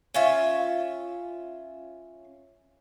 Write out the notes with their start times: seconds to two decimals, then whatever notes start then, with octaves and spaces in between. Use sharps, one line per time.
0.14 C#4 F4 E5